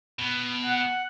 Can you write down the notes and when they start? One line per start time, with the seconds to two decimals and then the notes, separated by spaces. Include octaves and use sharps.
0.19 B2
0.66 F#5